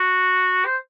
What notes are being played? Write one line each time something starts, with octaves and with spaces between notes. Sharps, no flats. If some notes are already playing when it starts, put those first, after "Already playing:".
Already playing: F#4
C5